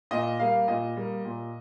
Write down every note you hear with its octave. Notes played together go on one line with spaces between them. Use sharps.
A#2 D#5
G3 A#3 F5
A#2 D#5
G3 A#3
A#2